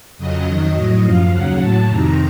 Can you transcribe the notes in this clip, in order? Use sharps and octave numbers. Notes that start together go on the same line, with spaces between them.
F2 C#3 F#3 D#5
F2 D#3 F#3
A2 F#3
F#2 F3 F5
D#2 C#3 F#3 F#5
A2 F#3 A5
F2 C3 D#3 A#5